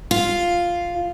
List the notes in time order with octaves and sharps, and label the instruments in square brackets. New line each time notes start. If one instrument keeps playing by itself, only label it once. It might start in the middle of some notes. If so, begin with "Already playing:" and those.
[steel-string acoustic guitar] F4